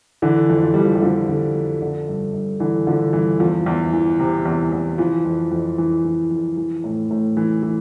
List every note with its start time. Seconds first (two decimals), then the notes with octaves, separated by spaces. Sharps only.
0.22 D3 E3
0.49 F2
0.63 F3
0.74 F2 G3
0.85 F3
0.95 G3
1.02 D3 F3
1.29 D3
1.55 F2
1.82 D3
2.08 G2
2.34 G2
2.60 D3 E3
2.87 D3 F3
3.13 G2 E3
3.40 E2 F3
3.66 E2
3.93 E3
4.20 C3
4.45 E2
4.72 E2
4.98 E3 F3
5.25 F2
5.51 F2
5.78 E3
6.04 E3
6.31 F2
6.57 E3
6.84 A2
7.11 A2
7.37 E3
7.63 E3